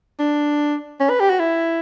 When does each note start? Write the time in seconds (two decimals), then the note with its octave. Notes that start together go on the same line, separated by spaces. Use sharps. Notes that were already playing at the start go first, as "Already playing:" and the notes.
0.20 D4
1.00 C#4
1.10 B4
1.20 G4
1.30 F#4
1.39 E4